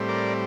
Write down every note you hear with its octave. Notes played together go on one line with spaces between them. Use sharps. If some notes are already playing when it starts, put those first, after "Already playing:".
Already playing: A2 G3 C4
A#4 D5